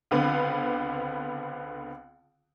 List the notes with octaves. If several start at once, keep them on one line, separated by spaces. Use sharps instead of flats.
C#2 D3 B3 C4